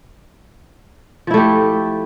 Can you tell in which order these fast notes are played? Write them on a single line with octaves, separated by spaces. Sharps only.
F3 E4 A3 G4